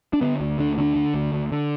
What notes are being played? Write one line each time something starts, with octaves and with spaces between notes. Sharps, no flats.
D4
D3 B3
D2
D2 D4
D3 D4
D3
D2
D2
D3